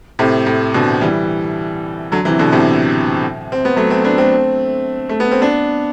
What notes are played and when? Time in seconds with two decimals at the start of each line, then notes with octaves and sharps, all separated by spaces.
0.19 A2 C3
0.46 A2
0.74 B2 D3
1.01 E3 G3
2.12 D3 F#3
2.25 C3 E3
2.39 B2 D3
2.52 A2 C3
3.52 C4
3.65 B3
3.76 F#3 A3
3.90 A3 C4
4.04 B3 D4
4.18 A3 C4
5.09 A3
5.20 B3
5.31 C4
5.42 B3 D4